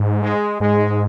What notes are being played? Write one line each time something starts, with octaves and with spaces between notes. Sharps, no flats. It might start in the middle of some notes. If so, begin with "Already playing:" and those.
Already playing: G#2
G#3
G#2 G#3